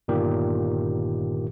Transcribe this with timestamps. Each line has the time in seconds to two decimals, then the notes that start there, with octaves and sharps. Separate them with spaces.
0.08 G1 A#2 D#3 G4